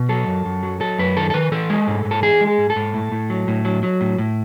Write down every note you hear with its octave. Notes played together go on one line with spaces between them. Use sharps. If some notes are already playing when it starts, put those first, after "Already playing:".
Already playing: B2
F#3 A4
F#2
F#2
F#3
F#3 A4
F#2 B4
D#3 A4
A4
D#3 B4
E3 A4
G#3
G#2
G#2
A4
E3 G#4
G#3
G#4
G#2
A4
G#2
A2
A2
F#3
A2
F#3
F#3
A2
A2